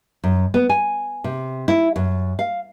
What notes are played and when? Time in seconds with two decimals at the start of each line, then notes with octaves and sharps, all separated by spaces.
0.24 F#2
0.54 B3
0.69 G#5
1.24 C3
1.68 E4
1.96 F#2
2.39 F5